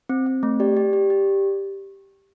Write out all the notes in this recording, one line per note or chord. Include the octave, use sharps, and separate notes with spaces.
C4
C4
A3
G4 D5
G4
G4
G4